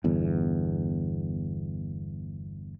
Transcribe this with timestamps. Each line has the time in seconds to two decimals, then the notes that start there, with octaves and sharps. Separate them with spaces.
0.04 G1 E2